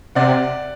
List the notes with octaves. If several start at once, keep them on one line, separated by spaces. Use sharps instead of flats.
C3 D5 F#5